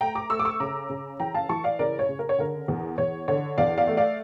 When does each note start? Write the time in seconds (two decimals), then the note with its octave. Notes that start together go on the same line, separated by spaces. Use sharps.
0.01 A3 G5 A#5
0.15 A#5 D6
0.30 A3 C#6 E6
0.39 D6
0.45 C#6 E6
0.60 C#3 A#5 D6
0.90 C#3
1.20 E3 G5 A#5
1.35 F5 A5
1.49 E3 A5 C#6
1.64 D5 F5
1.79 C#3 A#4 D5
1.99 C#5
2.09 C#3
2.19 A#4
2.29 C#5
2.39 D3 A#4
2.68 E2
2.98 E2 C#5
3.28 D3 C#5
3.58 E2 D5 F5
3.78 D5 F5
3.87 A3
3.97 D5 F5